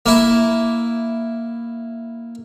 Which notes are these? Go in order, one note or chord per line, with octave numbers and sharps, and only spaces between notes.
A#3 E4